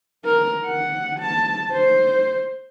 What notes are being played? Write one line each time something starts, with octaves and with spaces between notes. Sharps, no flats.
A#4
F#5
A5
C5